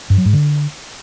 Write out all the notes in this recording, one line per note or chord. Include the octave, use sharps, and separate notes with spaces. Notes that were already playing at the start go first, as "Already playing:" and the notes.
G2
F#3
G#2
D3